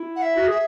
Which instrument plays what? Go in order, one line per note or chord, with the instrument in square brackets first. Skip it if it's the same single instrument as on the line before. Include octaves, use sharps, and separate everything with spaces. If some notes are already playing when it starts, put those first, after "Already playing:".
Already playing: [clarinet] E4
[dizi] F#5
E5
[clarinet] F#4
[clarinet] G#4 [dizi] E5